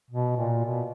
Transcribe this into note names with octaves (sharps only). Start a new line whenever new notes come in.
B2
A#2
B2